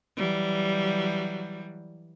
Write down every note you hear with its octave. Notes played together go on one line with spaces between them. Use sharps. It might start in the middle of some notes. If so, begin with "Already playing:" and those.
E3 F#3 G3